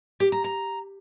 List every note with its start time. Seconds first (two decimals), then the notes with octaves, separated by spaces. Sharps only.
0.20 G4
0.32 A#5
0.44 A#5